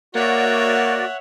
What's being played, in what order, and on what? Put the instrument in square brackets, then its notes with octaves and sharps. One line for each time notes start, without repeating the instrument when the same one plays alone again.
[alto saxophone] A#3 [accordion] F#4 D5 [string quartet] C#5 E5 [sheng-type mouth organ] F#5